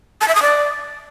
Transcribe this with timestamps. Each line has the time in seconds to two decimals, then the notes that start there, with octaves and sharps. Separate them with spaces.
0.21 A5
0.28 E5
0.35 D#6
0.42 D5